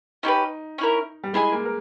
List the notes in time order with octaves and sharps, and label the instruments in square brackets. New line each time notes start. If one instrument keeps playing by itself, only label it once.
[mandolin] C#4 E4 G4 B4 [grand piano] D#4
[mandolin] C#4 E4 A#4
[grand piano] G3
[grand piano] G#3 [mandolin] E4 G#4 D#5 G#5
[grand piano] A#3
A#4